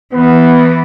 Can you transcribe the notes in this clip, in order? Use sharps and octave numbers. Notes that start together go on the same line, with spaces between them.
E3 B3